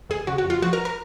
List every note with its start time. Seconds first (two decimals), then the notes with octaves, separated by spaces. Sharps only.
0.09 D#2 G#4
0.27 C#3 F#4
0.38 F#4
0.45 F2
0.50 F4
0.62 F3 F#4
0.73 A#4
0.85 A#4